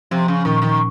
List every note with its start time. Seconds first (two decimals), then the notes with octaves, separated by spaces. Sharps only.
0.11 C3 F3
0.28 C#3
0.45 A#2 D#3
0.62 D#3